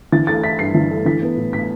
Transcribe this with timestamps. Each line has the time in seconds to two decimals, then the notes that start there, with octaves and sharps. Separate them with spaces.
0.12 E3 A6
0.27 A3 A6
0.43 E4 B6
0.59 G2 C7
0.75 E3
0.91 A3
1.06 E3 B6
1.22 B3
1.37 A2
1.53 A2 B6